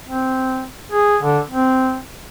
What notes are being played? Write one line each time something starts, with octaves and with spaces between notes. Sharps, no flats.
C4
G#4
D3
C4